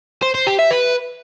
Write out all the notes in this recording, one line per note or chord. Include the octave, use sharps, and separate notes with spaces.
C5
C5
G4
E5
B4